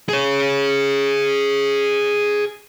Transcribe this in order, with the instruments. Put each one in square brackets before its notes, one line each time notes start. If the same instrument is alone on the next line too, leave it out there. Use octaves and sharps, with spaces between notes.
[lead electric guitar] G#4 C#5